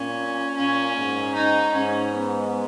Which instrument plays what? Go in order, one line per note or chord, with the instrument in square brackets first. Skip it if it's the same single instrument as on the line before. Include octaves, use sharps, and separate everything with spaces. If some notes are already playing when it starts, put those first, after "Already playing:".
Already playing: [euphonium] A#2 [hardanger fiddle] C#4
[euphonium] A#2 [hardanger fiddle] C#4
[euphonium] G#2
[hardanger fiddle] D#4
[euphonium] G#2 [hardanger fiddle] C#4
[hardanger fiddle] B3